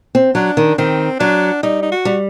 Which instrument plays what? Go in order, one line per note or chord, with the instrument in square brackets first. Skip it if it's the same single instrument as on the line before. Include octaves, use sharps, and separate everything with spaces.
[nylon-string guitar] C4
[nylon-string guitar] F#3 [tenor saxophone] D4
[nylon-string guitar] D#3
[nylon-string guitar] D#3 [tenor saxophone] C4
[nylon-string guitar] F#3 [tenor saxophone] D4
[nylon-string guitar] G3 [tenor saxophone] D#4
[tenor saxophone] D#4
F#4
[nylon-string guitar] G3